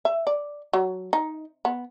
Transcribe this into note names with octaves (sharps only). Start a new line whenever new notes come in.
E5
D5
F#3
D#4
B3